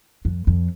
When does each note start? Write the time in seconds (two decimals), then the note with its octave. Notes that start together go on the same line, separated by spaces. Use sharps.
0.25 F2
0.47 F2